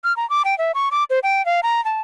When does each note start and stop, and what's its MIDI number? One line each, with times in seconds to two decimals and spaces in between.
0.04 0.15 89
0.17 0.28 82
0.30 0.42 86
0.45 0.57 79
0.58 0.72 76
0.75 0.89 85
0.91 1.04 86
1.10 1.19 72
1.23 1.44 79
1.46 1.61 77
1.63 1.83 82
1.85 2.01 81